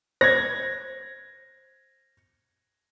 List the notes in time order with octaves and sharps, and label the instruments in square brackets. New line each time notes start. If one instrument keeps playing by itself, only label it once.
[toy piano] C5 [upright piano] G#6 A#6